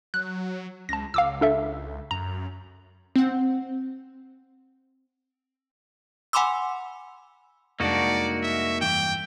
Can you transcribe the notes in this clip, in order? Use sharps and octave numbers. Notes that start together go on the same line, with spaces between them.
F#3 F#6
C#2 A5 A#6
C#2 F5 D6 E6
D4 A4 E5
F#2 A#5
C4 F#5
F#5 G#5 B5 C6 D6 E6
C2 F2 G#3 A#3 D4 D#4 F#4 D5
E5
G2 E3 G5